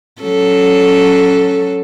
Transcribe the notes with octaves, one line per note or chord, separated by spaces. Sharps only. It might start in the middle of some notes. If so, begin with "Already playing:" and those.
F#3 C#4 A4